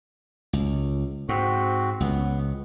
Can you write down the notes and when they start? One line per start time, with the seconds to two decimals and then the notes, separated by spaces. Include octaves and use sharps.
0.53 C#2
1.29 G#2 C4 F#4
2.00 C#2 B3